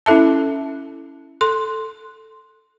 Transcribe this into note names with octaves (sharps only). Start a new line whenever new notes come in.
C#4 E4 A4 E5 A5
A4 C6